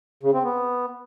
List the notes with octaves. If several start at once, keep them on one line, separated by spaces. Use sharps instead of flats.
C#3
C4
B3